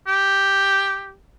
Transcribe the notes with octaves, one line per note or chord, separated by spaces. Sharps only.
G4